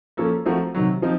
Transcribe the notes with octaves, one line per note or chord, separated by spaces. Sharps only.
F3 A#3 C#4 A4
F3 A3 C4 F#4 A#4
C3 D#3 F#3
F3 C4 D#4